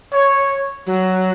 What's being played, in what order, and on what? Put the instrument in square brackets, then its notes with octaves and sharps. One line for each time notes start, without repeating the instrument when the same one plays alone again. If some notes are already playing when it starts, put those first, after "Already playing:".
[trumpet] C#5
[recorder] F#3